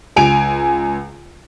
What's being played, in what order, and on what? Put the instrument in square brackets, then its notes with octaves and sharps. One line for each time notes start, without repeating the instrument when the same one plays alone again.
[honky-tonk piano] C#2 G#5 D7 F7